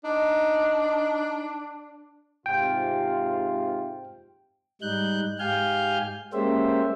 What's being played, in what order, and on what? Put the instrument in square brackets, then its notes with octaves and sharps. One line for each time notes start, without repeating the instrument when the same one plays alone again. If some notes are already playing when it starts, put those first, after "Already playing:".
[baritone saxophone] D4 [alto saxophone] D#4
[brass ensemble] G#2 C3 F4 [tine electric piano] G5
[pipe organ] G#2 G3 D#4 F#6 G6
G#2 G4 F5 G#5 F6 G6
G#3 A#3 C#4 G4 C5 E5